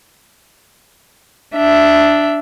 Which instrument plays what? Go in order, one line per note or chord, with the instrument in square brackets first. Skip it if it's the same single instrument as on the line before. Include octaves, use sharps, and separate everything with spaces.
[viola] D4 E5